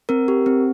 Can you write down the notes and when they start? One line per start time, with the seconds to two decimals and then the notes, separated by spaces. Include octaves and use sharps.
0.09 C4 A#4
0.28 G4
0.46 C4